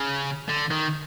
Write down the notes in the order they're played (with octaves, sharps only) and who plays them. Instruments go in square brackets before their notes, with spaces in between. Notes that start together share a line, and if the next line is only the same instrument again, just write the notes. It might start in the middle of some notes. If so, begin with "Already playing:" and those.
Already playing: [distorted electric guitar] C#3
D3
D#3